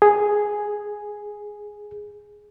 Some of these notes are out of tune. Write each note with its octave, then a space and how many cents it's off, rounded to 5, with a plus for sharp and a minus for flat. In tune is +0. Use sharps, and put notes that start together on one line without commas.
G#4 +0